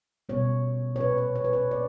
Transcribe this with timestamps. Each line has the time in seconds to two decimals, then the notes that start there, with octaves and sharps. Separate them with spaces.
0.29 B2 G3 B3 C#5
0.96 C#5
1.00 A#2 A#3 B4
1.18 C#5
1.36 C#5
1.44 B4
1.53 C#5
1.71 A#3 D5